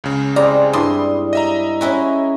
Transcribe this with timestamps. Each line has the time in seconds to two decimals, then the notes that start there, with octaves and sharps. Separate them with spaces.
0.04 C#2 C#3
0.36 G3 G#3 C4 D5 A#5
0.73 G2 E4 C6 D#6
1.33 D#5 E5 A#5
1.81 C#4 E4 F#4 C#5 G#5 C6